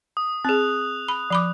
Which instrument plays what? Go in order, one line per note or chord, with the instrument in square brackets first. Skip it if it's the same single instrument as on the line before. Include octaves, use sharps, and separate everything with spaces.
[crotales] D#6
[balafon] C4 G#4 [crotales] F#6 F7
[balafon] B5
F3 B5 D6